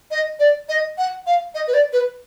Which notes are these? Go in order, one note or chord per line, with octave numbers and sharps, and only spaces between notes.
D#5
D5
D#5
F#5
F5
D#5
B4
D5
B4